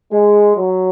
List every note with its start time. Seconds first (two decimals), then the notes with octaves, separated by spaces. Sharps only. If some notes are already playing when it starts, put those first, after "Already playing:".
0.11 G#3
0.57 F#3